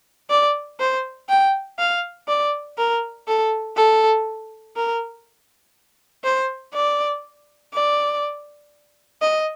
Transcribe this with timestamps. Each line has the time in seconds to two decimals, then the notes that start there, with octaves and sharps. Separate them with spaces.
0.30 D5
0.80 C5
1.29 G5
1.79 F5
2.28 D5
2.78 A#4
3.28 A4
3.77 A4
4.76 A#4
6.24 C5
6.74 D5
7.74 D5
9.21 D#5